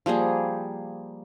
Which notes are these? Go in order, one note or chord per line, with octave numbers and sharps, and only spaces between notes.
F3 G3 A#3 G#4